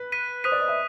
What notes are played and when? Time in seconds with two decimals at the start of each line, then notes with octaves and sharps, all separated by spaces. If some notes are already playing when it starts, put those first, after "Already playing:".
Already playing: B4
0.12 F#6 B6 D#7
0.44 C5 D#6 F#6 B6 D#7
0.52 D5
0.60 D#5
0.68 E5